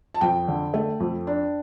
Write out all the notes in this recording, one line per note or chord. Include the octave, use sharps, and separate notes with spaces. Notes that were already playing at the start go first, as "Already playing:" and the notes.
A5
F2 G5
D3
A3
F2
D4